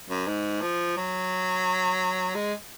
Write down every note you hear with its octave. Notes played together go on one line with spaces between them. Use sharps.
F#2
G#2
F3
F#3
G#3